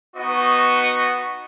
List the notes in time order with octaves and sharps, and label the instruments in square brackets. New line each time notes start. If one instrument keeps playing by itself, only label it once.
[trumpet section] B3 D#4 F#4 D#5 C#6